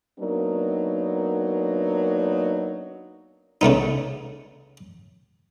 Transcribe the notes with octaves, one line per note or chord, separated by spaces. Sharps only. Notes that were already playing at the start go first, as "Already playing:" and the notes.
F#3 A#3 B3 D4 D#4 A#4
C#3 A3 B3 D#4